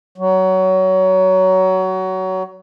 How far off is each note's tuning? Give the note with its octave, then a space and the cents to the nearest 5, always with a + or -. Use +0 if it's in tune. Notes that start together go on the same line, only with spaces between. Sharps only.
F#3 +20